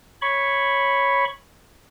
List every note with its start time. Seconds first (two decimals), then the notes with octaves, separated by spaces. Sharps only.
0.22 C#5 B5 C#6